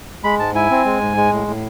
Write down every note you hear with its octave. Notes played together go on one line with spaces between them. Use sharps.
G#3 B5
G#2 A5
E4 G#5
C4
G#3
G#2
G#3
A2
A2